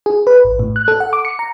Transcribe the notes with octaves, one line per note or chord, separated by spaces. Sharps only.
G#4
B4
A1
A2
F#6
A4
F#5
D6
C#7
A#5